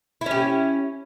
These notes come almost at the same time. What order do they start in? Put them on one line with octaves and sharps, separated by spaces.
E4 C#4 G4